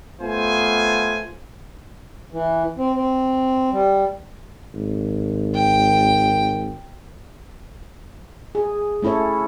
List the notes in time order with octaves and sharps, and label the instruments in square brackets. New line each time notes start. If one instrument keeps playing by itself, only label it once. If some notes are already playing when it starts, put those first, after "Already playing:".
[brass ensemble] A3 B3 F4 C5 G#5
[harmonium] E3
C4
C4
G3
[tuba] G#1
[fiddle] G5
[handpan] G#4
A3 C#4 E4 A4 C#5